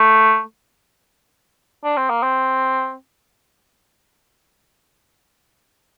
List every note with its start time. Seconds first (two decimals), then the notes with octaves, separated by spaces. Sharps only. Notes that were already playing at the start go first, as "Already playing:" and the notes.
Already playing: A3
1.84 D4
1.97 C4
2.10 A#3
2.23 C4